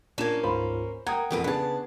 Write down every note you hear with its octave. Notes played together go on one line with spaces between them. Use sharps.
A#2 A#3 C#4 D4 G#6 E7
D2 G#2 F4 C5 B5
A#3 F#5 G5 A#5 D#6 G#6
E1 F2 A2 A#3 B4 D7
C#3 B3 D4 G#4 B4 A5